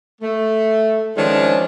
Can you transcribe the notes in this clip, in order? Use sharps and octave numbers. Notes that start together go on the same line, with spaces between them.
A3
D#3 F3 G#3 C#4 D4